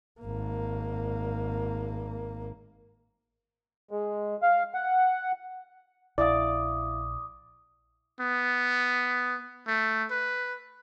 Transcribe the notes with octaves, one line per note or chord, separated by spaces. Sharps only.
G#1 A#3
G#3
F5
F#5
A#1 E4 D5 E5 F5 D6 D#6
B3
A3
B4